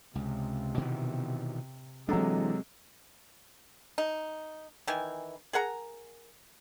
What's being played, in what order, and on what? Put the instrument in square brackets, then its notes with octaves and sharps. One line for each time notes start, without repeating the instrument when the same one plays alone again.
[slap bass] C#2 [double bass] C3
[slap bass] B2 D#3 E3
[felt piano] C3 F#3 A4 [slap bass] E3 D4 [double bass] G#3
[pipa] D#4
D#3 E3 G#5
G#4 A#4 F#5 A#5